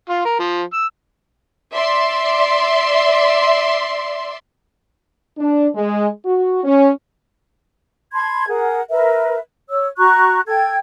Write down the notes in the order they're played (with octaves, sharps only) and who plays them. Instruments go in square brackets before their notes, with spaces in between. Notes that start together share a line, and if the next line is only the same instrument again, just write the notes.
[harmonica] F4
A#4
F3
E6
[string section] D5 E5 C6
[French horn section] D4
G#3
F#4
C#4
[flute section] A5 B5 C6 G#6
G#4 A#4 F#5
A#4 B4 E5
C#5 E6
F#4 A#5 C#6 F#6
A4 G5 G#6